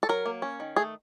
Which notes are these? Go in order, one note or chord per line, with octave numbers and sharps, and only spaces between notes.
A4
F#3 A#4
A#3
C#4
D#3
A3 G#4